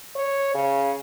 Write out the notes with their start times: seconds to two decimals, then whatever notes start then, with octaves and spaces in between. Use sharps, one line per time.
0.16 C#5
0.55 C#3